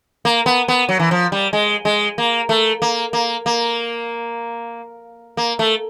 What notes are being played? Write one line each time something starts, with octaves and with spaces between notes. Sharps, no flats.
A#3
B3
B3
F#3
E3
F3
G3
G#3
G#3
A#3
A3
A#3
A#3
A#3
A#3
A3